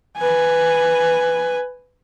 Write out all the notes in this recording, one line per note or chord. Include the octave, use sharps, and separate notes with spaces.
B4 G#5